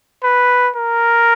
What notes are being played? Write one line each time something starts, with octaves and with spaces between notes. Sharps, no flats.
B4
A#4